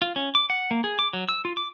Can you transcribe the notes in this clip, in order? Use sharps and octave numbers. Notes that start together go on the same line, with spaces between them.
F4
C#4
D6
F#5
A#3
G#4
D6
F#3
E6
F4
D6